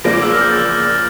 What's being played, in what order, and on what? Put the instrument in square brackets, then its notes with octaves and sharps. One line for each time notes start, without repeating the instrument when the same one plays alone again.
[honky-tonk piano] E2 C#3 F3 A#3 D4 [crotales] A#6
[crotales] D6
E6
F6
G6
A6